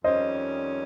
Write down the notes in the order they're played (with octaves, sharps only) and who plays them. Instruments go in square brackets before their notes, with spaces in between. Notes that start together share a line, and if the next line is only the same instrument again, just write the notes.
[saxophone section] F2 D#3 G3 C#4 [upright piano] C5 D#5